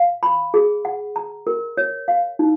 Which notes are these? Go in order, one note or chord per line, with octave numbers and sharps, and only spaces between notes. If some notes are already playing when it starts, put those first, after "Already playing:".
Already playing: F5
B5
G#4
F#5
A#5
A#4
C#5
F5
D#4